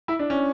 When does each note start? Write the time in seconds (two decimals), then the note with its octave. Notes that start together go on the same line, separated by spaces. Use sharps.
0.08 E4
0.19 D4
0.30 C#4